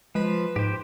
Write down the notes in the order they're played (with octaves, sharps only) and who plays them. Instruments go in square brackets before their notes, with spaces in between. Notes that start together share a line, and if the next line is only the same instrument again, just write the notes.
[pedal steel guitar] F3 [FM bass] G#3 [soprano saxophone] B4
[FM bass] G#2 [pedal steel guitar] G4 C5